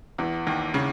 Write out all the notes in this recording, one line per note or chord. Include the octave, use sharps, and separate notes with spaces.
E2 E3
D#2 D#3
C#3